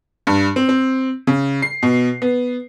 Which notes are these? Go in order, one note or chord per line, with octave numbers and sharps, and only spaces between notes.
G2
C4
C4
C#3
C7
B2
B3